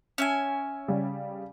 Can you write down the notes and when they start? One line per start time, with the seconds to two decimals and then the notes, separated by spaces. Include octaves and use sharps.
0.18 C#4 E5 G#5
0.88 C#3 G3